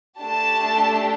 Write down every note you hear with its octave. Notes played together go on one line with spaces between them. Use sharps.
A3 D4 G4 A5